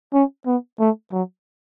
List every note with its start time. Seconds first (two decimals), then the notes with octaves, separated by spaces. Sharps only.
0.13 C#4
0.47 B3
0.80 A3
1.12 F#3